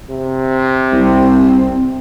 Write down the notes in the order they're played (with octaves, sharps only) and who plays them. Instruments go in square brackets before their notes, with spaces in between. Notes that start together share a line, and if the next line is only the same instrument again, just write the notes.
[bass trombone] C3
[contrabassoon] C2 [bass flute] C4